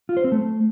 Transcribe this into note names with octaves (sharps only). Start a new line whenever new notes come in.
F4
C5
C4
A3